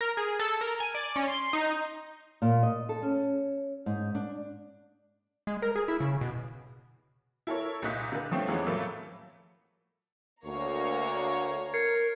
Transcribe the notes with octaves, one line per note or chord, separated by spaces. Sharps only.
A#4
G#4
A4
A#4
G#5
D5
C#4
C6
D#4
A#2
D#5
A4
C#4
G#2
D4
G#3
A#4
G#4
E4
C#3
B2
E4 A4 A#4 C#5
C2 A#2 D#4 F#6 B6
D3 B4
F3 A3 C4 C#4
E2 E3 F3 G#3 B3 C#4
A2 F3 F#3 A3 A#3
D2 A#3 C#5 A#5
A#4 G#6 C7 C#7